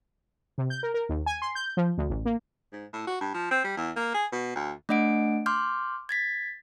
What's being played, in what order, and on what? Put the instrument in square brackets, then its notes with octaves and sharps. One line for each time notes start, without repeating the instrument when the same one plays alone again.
[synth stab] C3
G6
A#4
A#4
D#2
G#5
C6
G6
F3
D2
A1
A#3
[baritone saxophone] G#2
A2
F#4
G2
F3
C4
G3
E2
A#3
G#4
B2
D2
[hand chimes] A3 D4 D#5 F#5 D7
C6 D6 F6 G6
G#6 A6 B6